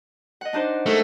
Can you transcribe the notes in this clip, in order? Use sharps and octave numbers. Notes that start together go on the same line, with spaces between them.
D#5 F#5
D4 D#4 C5
A3 G#4 A#4